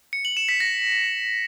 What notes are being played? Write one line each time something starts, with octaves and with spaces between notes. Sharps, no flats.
C#7
F#7
E7
B6
A#6